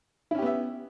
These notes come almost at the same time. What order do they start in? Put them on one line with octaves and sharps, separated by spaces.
E4 C#4 G4 B3 E5